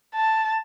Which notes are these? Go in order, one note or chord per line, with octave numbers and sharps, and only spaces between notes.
A5